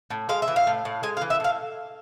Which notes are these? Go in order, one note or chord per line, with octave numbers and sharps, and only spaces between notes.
A2
G#3 F5
E5
E3
F5
A2
A2
G#3 G#5
F5
E3
E5
A2 F5